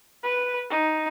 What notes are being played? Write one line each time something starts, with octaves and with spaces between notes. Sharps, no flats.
B4
D#4